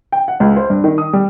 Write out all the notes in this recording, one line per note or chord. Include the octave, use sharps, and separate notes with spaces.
G5
F#5
C#2
C5
G2
D#3
D#6
G3